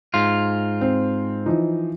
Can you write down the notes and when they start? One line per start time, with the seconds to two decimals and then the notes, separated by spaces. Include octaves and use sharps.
0.14 G#2 F4
0.81 C4
1.46 E3 F3 D#4